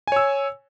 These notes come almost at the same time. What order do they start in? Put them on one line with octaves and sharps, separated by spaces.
G#5 C#5 E6